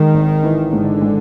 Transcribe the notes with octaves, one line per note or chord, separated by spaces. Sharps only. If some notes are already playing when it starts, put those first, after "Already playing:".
Already playing: D#3 G#3
G#1
E3
G#2 D3
G#3